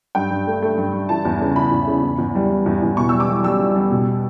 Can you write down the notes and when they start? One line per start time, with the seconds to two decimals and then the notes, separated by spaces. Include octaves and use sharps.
0.15 G2 G5
0.30 G2
0.47 A3
0.62 A3
0.77 G2
0.93 G2
1.09 E3 A5
1.25 E2
1.41 C#3
1.56 E3 B5
1.71 E2
1.87 C#3
2.03 E2
2.18 E2
2.35 G3
2.50 G3
2.66 E2
2.82 E2
2.97 B2 C#6
3.09 G3 E6
3.20 D6
3.29 G3
3.44 G3 E6
3.60 G3
3.76 G3
3.91 B2